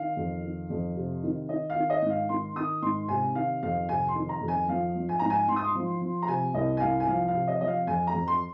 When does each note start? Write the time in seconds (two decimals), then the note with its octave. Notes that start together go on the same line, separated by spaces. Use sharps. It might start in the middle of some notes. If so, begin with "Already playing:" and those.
Already playing: D#3 F5
0.17 F2
0.43 D#3
0.70 F2
0.96 C3
1.23 D#3
1.49 D#3 D#5
1.70 F5
1.76 D#3
1.90 D#5
2.02 G#2
2.10 F5
2.29 D#3 C6
2.56 D#3 D#6
2.82 G#2 C6
3.09 C3 G#5
3.35 D#3 F5
3.63 F2 F5
3.89 C3 G#5
4.08 C6
4.16 D#3
4.29 A#5
4.41 F2
4.48 G#5
4.68 F3 F5
4.96 F3
5.09 G#5
5.19 G#2 A#5
5.30 G#5
5.48 G#2 C6
5.56 D#6
5.65 C6
5.75 F3
6.01 F3
6.22 A#5
6.28 C3 G#5
6.54 C2 D#5
6.77 G#5
6.81 C2 F5
7.00 G#5
7.08 F3 F5
7.28 F5
7.34 C3
7.48 D#5
7.61 F3 D#5
7.67 F5
7.87 F2 G#5
8.07 A#5
8.14 F2
8.28 C6